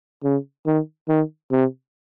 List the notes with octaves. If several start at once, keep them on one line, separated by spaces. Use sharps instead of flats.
C#3
D#3
D#3
C3